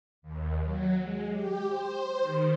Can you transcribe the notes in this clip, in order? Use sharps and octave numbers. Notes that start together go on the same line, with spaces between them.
D#2
F#3
G#3
G4
C5
D#3